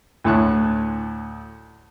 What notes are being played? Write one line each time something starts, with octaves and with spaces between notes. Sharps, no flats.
D2 A2 C#5 A5 C#6 F#6